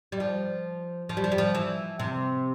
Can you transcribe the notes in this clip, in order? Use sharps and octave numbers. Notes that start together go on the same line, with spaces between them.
G3
F3
F3
G3
F3
G3
F3
E3
C3